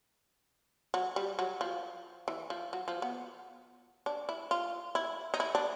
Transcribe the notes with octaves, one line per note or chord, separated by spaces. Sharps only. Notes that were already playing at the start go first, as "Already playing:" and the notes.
F#3
G3
F#3
F3
E3
F3
F#3
F3
B3
D4
E4
F4
E4
D#4
E4
D4